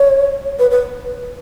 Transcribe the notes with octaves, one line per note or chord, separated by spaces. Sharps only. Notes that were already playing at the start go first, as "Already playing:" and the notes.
Already playing: C#5
B4
B4